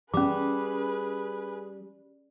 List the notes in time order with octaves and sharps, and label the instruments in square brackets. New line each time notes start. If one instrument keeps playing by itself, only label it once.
[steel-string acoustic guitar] G3 [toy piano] C#4 D6 [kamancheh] G#4 B4